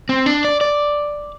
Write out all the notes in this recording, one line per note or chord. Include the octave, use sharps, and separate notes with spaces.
C4
D4
D5
D5